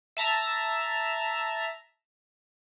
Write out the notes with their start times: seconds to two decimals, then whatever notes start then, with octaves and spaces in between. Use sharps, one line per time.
0.17 E5 A5 A#5